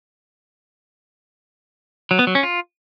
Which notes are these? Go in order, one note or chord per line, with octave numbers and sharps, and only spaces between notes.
F#3
B3
F#3
C#4
F4